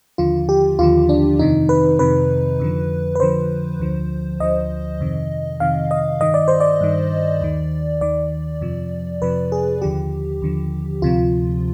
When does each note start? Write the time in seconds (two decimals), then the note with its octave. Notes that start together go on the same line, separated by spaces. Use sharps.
0.18 D#2 D3 F3 F4
0.49 G4
0.79 D#2 D3 F3 F4
1.09 D4
1.39 F2 C3 D#3 D#4
1.69 B4
1.99 F2 C3 D#3 B4
2.60 F2 D3 F3
3.15 B4
3.20 F2 D3 F3 C5
3.80 D2 D3 F3
4.40 D2 D3 F3 D#5
5.00 F2 C3 D#3
5.60 F2 C3 D#3 F5
5.91 D#5
6.21 G2 D#3 D#5
6.34 D5
6.48 C5
6.60 D5
6.81 G2 D#3
7.41 D#2 D#3
8.01 D#2 D#3 D5
8.61 F2 C3 F3
9.22 F2 C3 F3 B4
9.52 G#4
9.82 D#2 D3 F3 G4
10.42 D#2 D3 F3
11.02 D2 C3 F3 F4